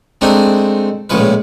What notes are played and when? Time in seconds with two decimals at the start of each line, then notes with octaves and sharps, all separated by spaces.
0.21 G#3 A3 C4 D4 D#4
1.10 A#1 A2 C#3 G#3 B4